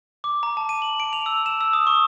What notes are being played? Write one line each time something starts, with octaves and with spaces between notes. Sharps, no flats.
D6
A#5
A5
D#7
F#7
D7
F7
E6
E7
E6
D#6
C#6